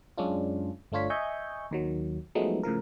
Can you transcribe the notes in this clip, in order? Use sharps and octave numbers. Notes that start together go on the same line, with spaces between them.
F#2 G#3 C#4 D4 F4
G1 A3 D4 F4 C#5 B6
D#5 E5 G#5 C#6 G6
D#2 D#3 F#3
F3 F#3 G#3 A3 B3 D#4
A2 C#3 F3 A#4